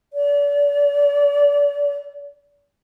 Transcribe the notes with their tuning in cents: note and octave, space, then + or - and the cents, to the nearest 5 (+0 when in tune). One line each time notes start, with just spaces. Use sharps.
D5 -35